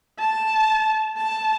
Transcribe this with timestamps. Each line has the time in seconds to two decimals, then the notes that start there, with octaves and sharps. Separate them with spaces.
0.19 A5
1.17 A5